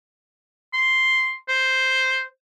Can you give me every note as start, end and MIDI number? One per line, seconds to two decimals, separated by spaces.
0.74 1.35 84
1.49 2.23 72